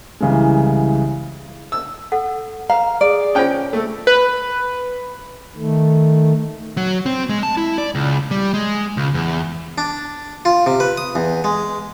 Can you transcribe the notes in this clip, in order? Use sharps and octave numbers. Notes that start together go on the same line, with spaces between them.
C2 C#3 E3 G#3
E6
A4 F#5
B4 F5 A#5
G#4 D5
C#4 F4 C5 C#5 G5
A3 A4
B4
D#3 A3
F#3
C4
G#3
A5
E4
D5
C#2
G3
G#3
C#2
E2
D4
F4
C3
B4
D#6
E2
G#3